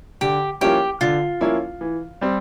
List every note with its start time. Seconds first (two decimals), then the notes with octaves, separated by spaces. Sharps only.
0.21 D3 G4
0.61 F3 A#3 C#4 E4 G4
1.01 D3 F4
1.41 F3 A#3 C#4 E4
1.81 E3
2.21 G3 C4